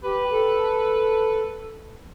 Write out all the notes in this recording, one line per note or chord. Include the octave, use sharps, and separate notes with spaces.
G4 B4
A4